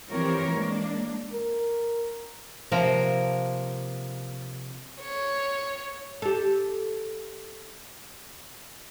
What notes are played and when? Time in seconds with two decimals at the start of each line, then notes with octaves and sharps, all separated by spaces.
0.10 E3 F3 C4 G4 A#4 C#5
0.53 G#3 A#3 D4
1.33 A#4
2.72 C3 F3 A#3 A#4
5.01 C#5
6.22 G4 A4